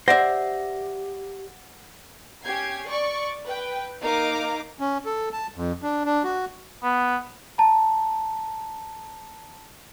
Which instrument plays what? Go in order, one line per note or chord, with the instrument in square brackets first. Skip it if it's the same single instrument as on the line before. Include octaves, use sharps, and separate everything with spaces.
[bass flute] G4 [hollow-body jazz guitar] C5 D5 E5 [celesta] F#5 [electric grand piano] A#6
[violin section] C#4 G4 G#6 C7
D5 C#6
B4 G5
A#3 D#4 A#4 F5 A#5 D6
[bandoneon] C#4
A4
A5
F2
D4
D4
F#4
[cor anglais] B3
[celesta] A5 A#5